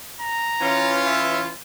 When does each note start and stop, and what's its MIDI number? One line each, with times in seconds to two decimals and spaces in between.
0.21 0.98 82
0.61 1.51 52
0.61 1.51 61
0.61 1.51 65
1.06 1.40 76